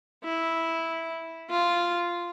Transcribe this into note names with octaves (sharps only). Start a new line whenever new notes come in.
E4
F4